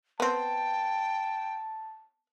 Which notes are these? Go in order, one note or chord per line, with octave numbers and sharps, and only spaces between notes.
B3 C4 G5 A5